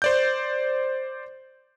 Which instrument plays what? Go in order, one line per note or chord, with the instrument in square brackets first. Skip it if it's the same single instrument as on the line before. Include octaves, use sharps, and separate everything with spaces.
[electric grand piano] C5 D5 G6